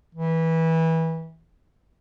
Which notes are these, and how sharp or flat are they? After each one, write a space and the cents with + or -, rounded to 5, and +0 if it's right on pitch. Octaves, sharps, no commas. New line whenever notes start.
E3 -20